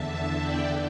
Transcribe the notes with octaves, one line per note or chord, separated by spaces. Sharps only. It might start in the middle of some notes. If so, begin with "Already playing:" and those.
Already playing: E2 D3 E5 A5
D5 G5